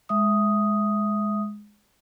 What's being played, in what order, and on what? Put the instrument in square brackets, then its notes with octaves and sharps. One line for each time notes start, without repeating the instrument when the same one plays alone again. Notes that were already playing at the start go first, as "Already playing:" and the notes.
[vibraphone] G#3 E5 D#6